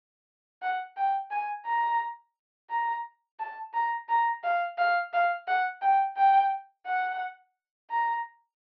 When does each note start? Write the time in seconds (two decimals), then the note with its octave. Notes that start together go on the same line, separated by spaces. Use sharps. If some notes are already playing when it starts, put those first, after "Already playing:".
0.62 F#5
0.97 G5
1.31 G#5
1.66 A#5
2.70 A#5
3.39 A5
3.74 A#5
4.09 A#5
4.44 F5
4.78 F5
5.13 F5
5.48 F#5
5.82 G5
6.17 G5
6.86 F#5
7.90 A#5